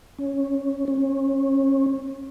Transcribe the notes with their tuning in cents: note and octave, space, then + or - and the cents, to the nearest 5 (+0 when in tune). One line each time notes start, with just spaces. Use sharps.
C#4 -5
C#4 -30